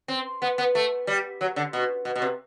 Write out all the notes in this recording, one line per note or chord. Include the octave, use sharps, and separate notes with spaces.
C4
B3
B3
A3
G3
F#3
D3
B2
B2
B2
C3